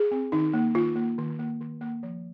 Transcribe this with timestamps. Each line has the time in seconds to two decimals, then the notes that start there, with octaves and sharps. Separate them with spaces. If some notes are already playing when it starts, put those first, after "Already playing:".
Already playing: G#4
0.11 C4
0.32 D#3 D#4
0.53 A#3
0.75 D#3 F4
0.96 A#3
1.18 D#3
1.39 A#3
1.60 D#3
1.81 A#3
2.03 F3